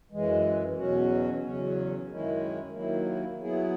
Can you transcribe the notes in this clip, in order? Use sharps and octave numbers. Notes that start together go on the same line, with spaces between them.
F#2 E3 G#3
E2 B2 F#3 C#4 F#4
E2 C#3 F#3 C#4
F#2 D#3 G#3 C#4 E4
D#2 D#3 F#3 A#3 E4
F#3 B3 E4 G#4